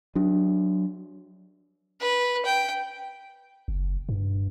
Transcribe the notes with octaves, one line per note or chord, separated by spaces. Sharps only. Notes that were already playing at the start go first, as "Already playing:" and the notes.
F#3 D4
B4
G5
F#1
G2